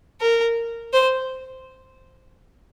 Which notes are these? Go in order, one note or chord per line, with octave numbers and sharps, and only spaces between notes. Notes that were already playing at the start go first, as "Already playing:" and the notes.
A#4
C5